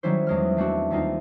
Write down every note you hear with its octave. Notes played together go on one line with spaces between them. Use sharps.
D#3 F#3 G3 C#4 E4 C5
E2 G#3 F6
A3 C4 D4 F#4
D#2 G3 C4 D#4 F4